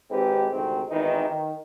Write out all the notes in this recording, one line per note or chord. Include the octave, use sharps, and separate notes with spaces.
G#1 G#2 C4 G4 B4
D2 G#2 C3 D#3 C4
G#1 E2 D#3 E3 D#4
D#3